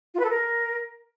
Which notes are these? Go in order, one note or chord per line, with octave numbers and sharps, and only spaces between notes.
F4
B4
A4
A#4